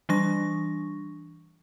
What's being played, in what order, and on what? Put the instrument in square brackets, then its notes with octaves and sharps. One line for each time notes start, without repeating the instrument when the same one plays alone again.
[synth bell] E3 G3 D4 C#6 A#6